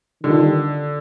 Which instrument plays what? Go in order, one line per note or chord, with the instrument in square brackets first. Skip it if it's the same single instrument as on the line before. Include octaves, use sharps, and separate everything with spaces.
[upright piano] D3 [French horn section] D#3 G3 D4 F4